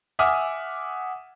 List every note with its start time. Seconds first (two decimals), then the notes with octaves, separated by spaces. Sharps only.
0.19 E5 F#5 G#5 D6 D#6 F6